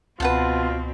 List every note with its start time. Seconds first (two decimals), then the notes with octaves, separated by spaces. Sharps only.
0.20 C#2 B2 C4 F4 B4 F#5 A5